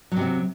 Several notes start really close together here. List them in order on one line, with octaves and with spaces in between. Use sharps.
F#3 C3 C4